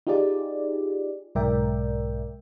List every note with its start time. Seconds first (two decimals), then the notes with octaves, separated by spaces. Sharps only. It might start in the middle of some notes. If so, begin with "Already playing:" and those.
0.07 D#4 F4 G4 G#4 D5
1.35 B1 G#2 A#4 D5 E5 G5